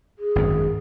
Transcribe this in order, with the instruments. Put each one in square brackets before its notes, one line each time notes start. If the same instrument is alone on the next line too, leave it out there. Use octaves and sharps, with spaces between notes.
[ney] G#4
[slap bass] G#1 F#2